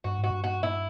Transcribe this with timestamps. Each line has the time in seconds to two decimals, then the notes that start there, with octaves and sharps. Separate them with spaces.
0.04 G2 F#4
0.18 G#2
0.24 F#4
0.31 G2
0.44 F#4
0.63 E4